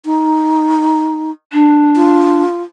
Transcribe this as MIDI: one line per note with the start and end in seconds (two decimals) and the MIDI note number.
0.05 1.31 63
1.53 2.43 62
1.96 2.63 65